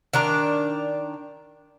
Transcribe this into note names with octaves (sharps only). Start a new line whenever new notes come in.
D#3 D4 A#5